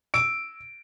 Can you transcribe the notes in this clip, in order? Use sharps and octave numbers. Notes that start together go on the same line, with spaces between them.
E6 D7